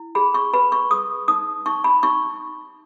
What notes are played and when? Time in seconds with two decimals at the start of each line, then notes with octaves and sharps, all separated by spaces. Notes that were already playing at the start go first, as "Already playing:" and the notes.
Already playing: E4
0.15 G#4 B5
0.34 C#6
0.53 B4 B5
0.72 C#6
0.91 G#4 D#6
1.28 D#4 D#6
1.66 D#4 C#6
1.84 B5
2.03 D#4 C#6